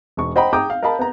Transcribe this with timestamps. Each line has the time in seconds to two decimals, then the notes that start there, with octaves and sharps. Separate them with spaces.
0.17 E1 C#6
0.36 C5 D#5 F#5 G5 A#5 B5
0.53 G5 A#5 D6 D#6 G6
0.70 F5
0.82 A#4 D#5 F5 A5 B5
0.99 B3 A#5